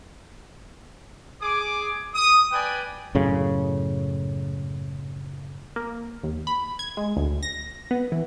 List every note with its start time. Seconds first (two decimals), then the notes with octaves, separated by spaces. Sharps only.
1.42 G#4 D6
2.15 D#6
2.53 B4 D5 G5 G#5
3.15 F#2 A2 C#3
5.76 A#3
6.23 D#2
6.47 B5
6.79 G#6
6.97 G#3
7.17 D2
7.43 A#6
7.91 B3
8.12 E3